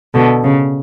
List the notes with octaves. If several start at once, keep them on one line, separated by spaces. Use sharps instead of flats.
B2 D3
C#3